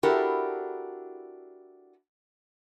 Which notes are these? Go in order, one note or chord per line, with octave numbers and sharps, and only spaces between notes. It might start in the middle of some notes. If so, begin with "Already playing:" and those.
D4 E4 F#4 G4 A4 A#4